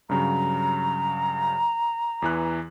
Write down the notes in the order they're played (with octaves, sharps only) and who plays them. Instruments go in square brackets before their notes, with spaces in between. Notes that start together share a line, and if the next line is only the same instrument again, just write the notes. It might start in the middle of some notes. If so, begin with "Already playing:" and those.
[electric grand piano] G2 C#3 F#3 [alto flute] A#5
[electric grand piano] E2 E3 F#6